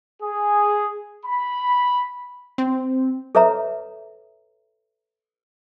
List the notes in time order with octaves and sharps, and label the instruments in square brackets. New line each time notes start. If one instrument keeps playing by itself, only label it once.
[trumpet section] G#4
B5
[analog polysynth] C4
[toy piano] A4 B4 C#5 E5 A#5